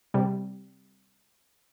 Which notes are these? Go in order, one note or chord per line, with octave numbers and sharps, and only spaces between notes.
C3 G3